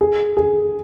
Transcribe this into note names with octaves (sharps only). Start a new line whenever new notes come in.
G#4
G#4